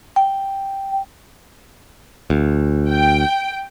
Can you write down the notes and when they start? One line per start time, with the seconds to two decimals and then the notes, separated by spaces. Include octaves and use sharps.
0.16 G5
2.30 D2
2.89 G5